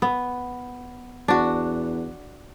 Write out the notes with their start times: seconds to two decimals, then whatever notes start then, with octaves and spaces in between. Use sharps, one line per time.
0.02 B3
1.28 E2 D4 F#4